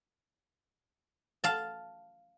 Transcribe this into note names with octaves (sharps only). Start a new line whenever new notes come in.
F5 A5